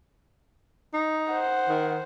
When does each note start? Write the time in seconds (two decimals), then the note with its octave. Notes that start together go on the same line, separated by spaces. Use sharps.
0.93 D#4
1.31 C5 F#5
1.69 D#3